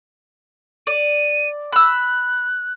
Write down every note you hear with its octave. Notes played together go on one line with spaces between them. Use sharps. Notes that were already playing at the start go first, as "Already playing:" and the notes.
D5 D#7
B5 E6 F#6